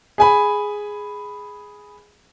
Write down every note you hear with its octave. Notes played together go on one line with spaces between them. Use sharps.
G#4 G#5 B5